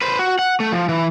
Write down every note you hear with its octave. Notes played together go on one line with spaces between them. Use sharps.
B4 C5
F#4
F#5
A3
F3
E3